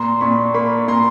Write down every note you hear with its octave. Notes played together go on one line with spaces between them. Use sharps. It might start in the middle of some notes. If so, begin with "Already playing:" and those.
Already playing: A#2 A#5 C6
A#2 B5 C#6
A#3 B5 C#6
A#2 A#5 C6